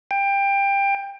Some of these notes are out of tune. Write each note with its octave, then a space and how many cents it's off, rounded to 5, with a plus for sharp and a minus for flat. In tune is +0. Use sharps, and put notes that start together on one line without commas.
G5 +20